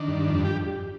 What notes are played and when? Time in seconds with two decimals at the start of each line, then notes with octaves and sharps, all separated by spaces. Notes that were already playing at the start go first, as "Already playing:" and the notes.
Already playing: D#3 D4
0.08 G2
0.28 F2
0.45 G4